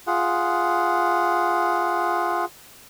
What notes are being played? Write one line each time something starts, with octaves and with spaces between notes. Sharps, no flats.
F4 G#4 F#5